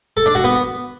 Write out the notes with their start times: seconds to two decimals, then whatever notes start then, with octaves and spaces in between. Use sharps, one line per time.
0.17 A4
0.26 D4
0.35 F#4
0.44 B3